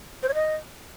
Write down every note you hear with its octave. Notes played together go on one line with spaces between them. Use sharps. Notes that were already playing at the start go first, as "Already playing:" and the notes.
C5
C#5
D#5